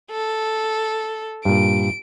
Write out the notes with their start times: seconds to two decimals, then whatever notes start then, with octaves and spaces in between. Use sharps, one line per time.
0.11 A4
1.45 G2 A#2 D7